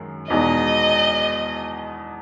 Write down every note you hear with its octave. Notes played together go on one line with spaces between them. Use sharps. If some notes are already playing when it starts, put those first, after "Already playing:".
Already playing: F#2 D#3 G#3
E2 B2 G#3 D#4 D#5